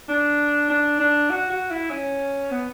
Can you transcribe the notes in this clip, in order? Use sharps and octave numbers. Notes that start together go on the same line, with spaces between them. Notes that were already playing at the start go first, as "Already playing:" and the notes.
D4
D4
D4
F#4
F#4
E4
C#4
B3